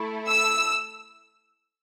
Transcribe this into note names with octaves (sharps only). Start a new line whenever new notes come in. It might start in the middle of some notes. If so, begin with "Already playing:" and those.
Already playing: A3 E4 A4
E6